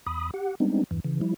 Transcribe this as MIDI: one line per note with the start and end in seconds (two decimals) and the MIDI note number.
0.06 0.31 40
0.06 0.31 83
0.06 0.31 87
0.34 0.55 67
0.34 0.55 78
0.60 0.84 55
0.60 0.84 56
0.60 0.84 59
0.60 0.84 60
0.60 0.84 62
0.60 0.84 63
0.91 1.00 40
0.91 1.00 43
0.91 1.00 52
1.04 1.20 49
1.04 1.20 52
1.21 1.34 53
1.21 1.34 55
1.21 1.34 64